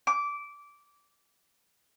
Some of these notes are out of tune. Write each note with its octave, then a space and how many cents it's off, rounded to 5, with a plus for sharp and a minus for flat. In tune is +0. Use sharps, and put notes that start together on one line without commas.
D6 -15